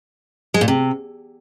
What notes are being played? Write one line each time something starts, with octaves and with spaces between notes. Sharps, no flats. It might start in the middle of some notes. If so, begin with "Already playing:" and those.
G#3
A#2
C3